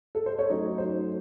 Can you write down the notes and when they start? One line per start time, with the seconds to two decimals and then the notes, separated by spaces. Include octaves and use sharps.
0.15 A4
0.26 C5
0.39 C#5
0.50 F#3 A3 C#4 D#4 D#5
0.78 C5